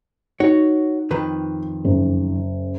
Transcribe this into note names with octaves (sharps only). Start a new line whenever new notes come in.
D#4 F#4 C#5
F2 D#3 B4
F#1